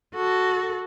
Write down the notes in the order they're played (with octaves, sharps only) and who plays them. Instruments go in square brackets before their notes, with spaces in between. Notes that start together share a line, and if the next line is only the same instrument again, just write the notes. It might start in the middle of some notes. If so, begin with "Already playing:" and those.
[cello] F#4 A4